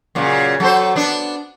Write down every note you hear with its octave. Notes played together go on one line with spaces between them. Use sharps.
F#2 A#2 C#3
F#3 A4 C5
B3 D4